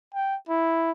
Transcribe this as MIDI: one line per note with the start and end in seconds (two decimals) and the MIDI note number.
0.15 0.36 79
0.49 0.91 64